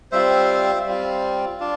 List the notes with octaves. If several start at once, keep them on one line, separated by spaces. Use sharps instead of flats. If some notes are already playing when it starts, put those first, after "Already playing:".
G3 C4 F4 C5 E5
G3 C4 F4
D4 F4